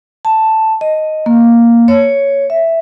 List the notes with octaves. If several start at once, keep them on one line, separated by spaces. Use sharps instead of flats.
A5
D#5
A#3
C#5
E5